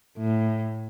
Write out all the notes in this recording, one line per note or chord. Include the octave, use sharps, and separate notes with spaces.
A2